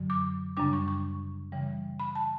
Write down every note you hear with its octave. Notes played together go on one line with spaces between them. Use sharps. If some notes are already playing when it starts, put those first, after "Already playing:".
Already playing: F#2 D3 F#3
D6
F#2 C#3 G3 D4 D6
C#6
C#6
C#3 E3 G3
B5
A5